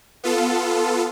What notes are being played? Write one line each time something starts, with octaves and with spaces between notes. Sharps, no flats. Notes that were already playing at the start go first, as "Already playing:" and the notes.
B3 F4 A4